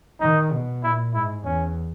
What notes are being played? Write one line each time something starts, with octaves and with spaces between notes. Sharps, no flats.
D#3 D#4
B2
A#2 E4
G#2 E4
E2 C#4